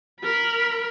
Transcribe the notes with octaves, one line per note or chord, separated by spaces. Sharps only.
A#4 B5